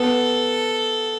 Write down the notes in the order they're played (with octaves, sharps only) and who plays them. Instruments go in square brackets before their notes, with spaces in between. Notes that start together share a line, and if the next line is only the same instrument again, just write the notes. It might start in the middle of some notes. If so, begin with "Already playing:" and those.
Already playing: [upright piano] B3 [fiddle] A4